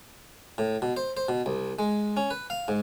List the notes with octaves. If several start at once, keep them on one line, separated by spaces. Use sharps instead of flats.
A2
B2
C5
C5
B2
C2
G#3
C#4
B4
F5
G#2